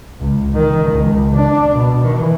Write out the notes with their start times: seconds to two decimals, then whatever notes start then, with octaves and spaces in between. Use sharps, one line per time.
0.20 C#2
0.54 D#3
0.91 C#2
1.34 D4
1.74 B2
2.03 E3